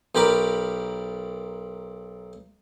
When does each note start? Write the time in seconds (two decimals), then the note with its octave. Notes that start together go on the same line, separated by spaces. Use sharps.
0.15 B1 G4 A#4 B5 D6